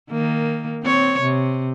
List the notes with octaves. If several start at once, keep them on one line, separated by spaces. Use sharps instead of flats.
D#3 A#3
C4 C#5
C3